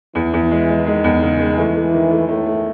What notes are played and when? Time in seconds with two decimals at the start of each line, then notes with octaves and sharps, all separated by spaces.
0.15 E2 E3
0.34 E2
0.51 G#3
0.68 G#3
0.86 D#3 G#3
1.04 E2
1.22 C#3
1.40 G#3
1.58 E3 A3
1.75 A3
1.93 D#3
2.11 A3
2.28 A2 A3
2.46 A3